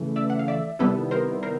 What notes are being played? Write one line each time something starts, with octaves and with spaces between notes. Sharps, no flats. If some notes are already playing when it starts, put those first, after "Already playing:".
Already playing: C#3 E3 A3
D5 E5
F#5
F5
D5 E5
C3 D#3 G3 B3 E4 A4 B4
A#4 C5
A#4 C5